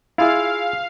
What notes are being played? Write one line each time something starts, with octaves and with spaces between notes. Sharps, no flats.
E4 F4 G#4 F5